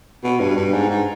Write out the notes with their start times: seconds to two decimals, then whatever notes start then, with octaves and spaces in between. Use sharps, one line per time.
0.24 B2
0.40 G2
0.57 G2
0.73 G#2
0.90 G#2